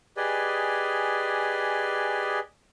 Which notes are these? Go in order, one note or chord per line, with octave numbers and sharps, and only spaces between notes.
G4 G#4 B4 D5 D#5 G#5